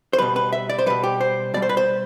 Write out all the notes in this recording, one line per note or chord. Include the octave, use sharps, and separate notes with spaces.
C5
B2 G3 B4
B4
E5
D5
C5
B2 G3 B4
G4
C5
B2 G3 D5
C5
B4
C5